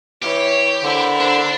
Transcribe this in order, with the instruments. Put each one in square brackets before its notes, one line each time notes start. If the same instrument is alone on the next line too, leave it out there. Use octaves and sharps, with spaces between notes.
[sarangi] E3 [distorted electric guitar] G4 [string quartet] C#5
[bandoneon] D3 [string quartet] E4 A4 A#4 [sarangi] C5
[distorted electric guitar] D4 [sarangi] C5